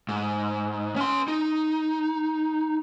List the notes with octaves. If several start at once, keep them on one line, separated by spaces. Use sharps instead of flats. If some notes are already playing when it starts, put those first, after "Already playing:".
G#2
C#4 C6
D#4